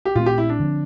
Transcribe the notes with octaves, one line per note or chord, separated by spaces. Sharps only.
G4
A#2 A3 C4 F4
G4
E4
D4
D3 F3 C4